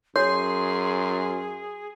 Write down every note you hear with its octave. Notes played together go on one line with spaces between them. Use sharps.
F#2 G#4 C#5 C6